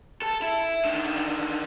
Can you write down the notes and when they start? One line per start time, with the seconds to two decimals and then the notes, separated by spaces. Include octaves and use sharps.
0.22 A4
0.42 E4
0.85 D3 D#3